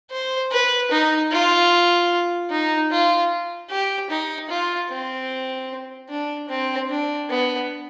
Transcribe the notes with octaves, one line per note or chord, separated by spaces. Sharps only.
C5
B4
D#4
F4
D#4
F4
G4
D#4
F4
C4
D4
C4
D4
B3